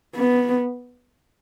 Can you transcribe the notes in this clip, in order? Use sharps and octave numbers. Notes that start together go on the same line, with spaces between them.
B3